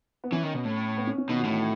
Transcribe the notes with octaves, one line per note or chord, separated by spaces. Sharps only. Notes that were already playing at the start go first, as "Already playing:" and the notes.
B3
E3 C#4
D#3
B2
A2
B3
C#4
C#4
B2 D#3 D#4
F#4
A2 E3 E4